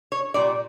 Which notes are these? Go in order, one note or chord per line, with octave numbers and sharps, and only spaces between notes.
C#5
A#2 G3 D5